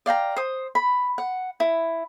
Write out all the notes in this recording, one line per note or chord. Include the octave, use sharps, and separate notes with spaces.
D5 F5 G5 A#5
C5 D#6
B5
F#5
E4